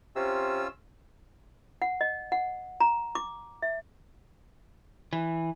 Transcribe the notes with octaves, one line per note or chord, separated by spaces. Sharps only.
C3 C#4 F4 E6
F#5
D#5
F#5
A#5
D6
E5
E3